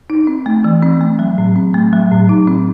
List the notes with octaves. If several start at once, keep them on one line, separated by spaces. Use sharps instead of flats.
D#4
C4
A3
E3
C4
A3
F#3
A2
C4
A3
F#3
A2
D#4
C4